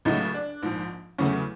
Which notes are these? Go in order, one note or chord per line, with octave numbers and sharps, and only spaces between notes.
C#2 C#3 F#3 A3 D#4
D4
A#1 G#2 F3
E2 C#3 F#3 A3 C#4